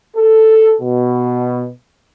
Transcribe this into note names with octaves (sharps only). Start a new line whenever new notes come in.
A4
B2